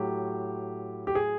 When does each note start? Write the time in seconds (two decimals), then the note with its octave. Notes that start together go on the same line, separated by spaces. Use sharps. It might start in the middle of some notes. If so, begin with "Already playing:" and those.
Already playing: A2 F#3 G4
1.07 G4
1.15 G#4